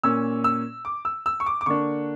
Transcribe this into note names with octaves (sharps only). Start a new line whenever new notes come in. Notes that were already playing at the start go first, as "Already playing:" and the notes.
A#2 A#3 C#4 E6
E6
D6
E6
E6
C#6
D6
D6
D3 A#3 D4 C#6